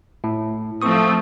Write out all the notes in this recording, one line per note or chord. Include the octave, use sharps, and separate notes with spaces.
A2
F3 A3 C4 C#6 D#6